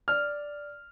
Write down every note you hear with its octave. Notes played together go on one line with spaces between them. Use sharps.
D5 F6